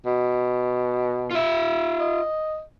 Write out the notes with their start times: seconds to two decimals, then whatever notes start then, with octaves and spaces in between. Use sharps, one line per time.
0.06 B2
1.31 F4 E5
2.00 D#5